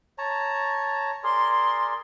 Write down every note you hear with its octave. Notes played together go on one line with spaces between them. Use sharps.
C#5 A5 A#5
G#4 A#4 D5 C6